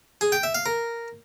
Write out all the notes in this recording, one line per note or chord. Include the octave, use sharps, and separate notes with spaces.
G#4
G5
E5
F5
A#4